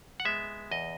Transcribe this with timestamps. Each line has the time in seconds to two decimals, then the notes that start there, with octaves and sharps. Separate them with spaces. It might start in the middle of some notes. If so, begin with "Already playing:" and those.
0.20 F#5
0.25 G#3 B3 E5
0.71 E2 D#5